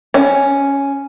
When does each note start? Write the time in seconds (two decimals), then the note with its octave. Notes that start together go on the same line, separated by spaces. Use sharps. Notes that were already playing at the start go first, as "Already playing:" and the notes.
0.14 C#4